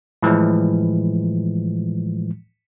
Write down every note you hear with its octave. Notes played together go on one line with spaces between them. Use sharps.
A2 E3 F3 G#3